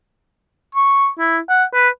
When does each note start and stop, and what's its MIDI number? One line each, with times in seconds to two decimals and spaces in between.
0.75 1.09 85
1.19 1.39 64
1.49 1.64 78
1.74 1.89 71